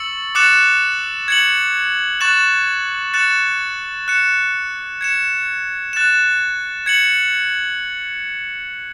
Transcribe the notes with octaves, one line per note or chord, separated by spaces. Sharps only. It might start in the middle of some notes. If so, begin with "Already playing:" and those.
Already playing: C#6 E6 A6 C#7 F#7
D6 F#6 A6 C#7 E7
G#6 C#7 F#7
C#6 F#6 A6 E7
F#6 A6 C#7 E7
F#6 C#7 E7
G#6 C#7 E7
F#6 A6 E7
G#6 C#7 F#7